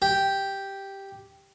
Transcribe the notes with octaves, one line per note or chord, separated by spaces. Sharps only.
G4